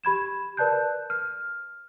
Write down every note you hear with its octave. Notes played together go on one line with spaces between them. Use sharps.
G4 B5 G#6 E7
A#4 B4 D5 A5 F#6 G6
F6